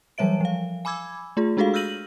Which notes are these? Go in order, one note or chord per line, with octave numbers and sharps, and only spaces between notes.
E3 F#3 G3 C#5 E5 D7
F3 F5
G#5 B5 D6 E6 G#6
A3 F4 G#4
G#3 D4 F#4 G#4 A4 F5
E6 F6 G6 A#6 D#7 F#7